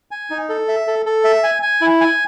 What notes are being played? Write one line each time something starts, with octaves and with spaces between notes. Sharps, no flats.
G#5
D#4
A4
E5
A4
A4
E5
G#5
G#5
E4
G#5